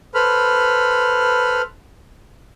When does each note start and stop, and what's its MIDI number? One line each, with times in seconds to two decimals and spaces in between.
0.15 1.62 69
0.15 1.62 71
0.15 1.62 72
0.15 1.62 83
0.15 1.62 89